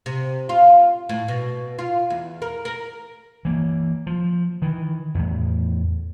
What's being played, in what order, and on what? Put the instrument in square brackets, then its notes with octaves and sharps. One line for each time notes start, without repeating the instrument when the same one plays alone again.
[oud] C3
F4
A2
B2
F4
E2
A#4
A#4
[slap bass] E3 A#3
F3
D#3 E3
E2 A2